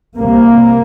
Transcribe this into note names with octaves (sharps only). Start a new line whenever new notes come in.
C2 C3 A#3